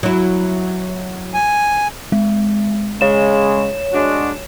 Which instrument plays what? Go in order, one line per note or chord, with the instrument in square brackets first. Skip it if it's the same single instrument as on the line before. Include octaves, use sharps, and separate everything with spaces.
[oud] F#3 E4
[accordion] G#5
[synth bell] G#3
[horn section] C#3 G#3 [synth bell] C#5 E7
[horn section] G#3 D4 F#4